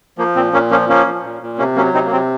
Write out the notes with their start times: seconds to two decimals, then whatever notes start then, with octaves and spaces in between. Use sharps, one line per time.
0.18 F3 A#3
0.35 A#2 C4
0.53 A#2 A#3 C#4
0.71 F3 A#3 C#4
0.89 F3 A#3 C#4
1.07 F3
1.23 A#2
1.42 A#2
1.58 C3 A#3 C#4
1.76 F#3 A#3 C#4
1.94 C3 C4 D#4
2.05 A#3
2.12 C3 C4